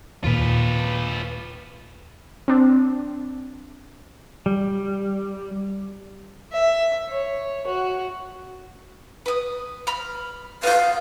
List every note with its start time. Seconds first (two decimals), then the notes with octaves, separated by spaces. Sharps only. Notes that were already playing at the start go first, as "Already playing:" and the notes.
0.24 D#2 A#2 F4 B4
2.48 C4 D4
4.46 G3
6.53 E5
7.09 C#5
7.67 F#4
9.26 B4 D#6
9.87 B5 F6
10.63 B3 F5 G6